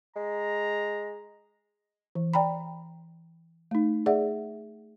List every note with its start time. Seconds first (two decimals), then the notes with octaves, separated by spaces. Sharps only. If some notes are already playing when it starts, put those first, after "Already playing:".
0.16 G#3 A#5
2.15 E3
2.34 D5 G5 A#5 B5
3.71 A3 D#4
4.06 G#4 D5 E5 F#5